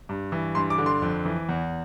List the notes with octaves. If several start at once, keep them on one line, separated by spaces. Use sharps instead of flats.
G2
E3
G2 C6
D6
D3
C6
F2
E3
E2